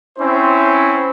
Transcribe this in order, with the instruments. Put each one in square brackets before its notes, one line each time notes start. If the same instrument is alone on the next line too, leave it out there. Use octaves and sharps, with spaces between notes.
[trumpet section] C4 C#4 E4 C5